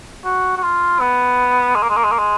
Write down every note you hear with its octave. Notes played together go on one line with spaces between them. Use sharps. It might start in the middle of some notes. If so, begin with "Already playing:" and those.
F#4
F#4
F4
B3
G#3
A#3
G#3
A#3
G#3
A#3
G#3